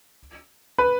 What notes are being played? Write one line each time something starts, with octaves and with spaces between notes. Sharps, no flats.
B4